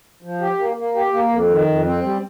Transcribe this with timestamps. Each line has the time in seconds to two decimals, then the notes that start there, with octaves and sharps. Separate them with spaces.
0.22 F3
0.41 G4
0.59 A#3
0.77 A#3
0.95 G4
1.13 A#3
1.31 F2
1.49 D#3
1.67 F2
1.85 C4
2.03 G3